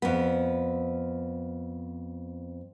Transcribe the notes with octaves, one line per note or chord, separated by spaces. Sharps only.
F2 B3